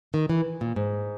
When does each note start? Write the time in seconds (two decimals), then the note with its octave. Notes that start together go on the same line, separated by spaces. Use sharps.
0.14 D#3
0.29 E3
0.61 A#2
0.76 G#2